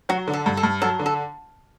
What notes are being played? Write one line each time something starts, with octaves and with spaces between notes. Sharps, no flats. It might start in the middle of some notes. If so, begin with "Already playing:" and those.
F#3 F#4
D3
A4
G2
A4
G2
F#3 A4
D3
A4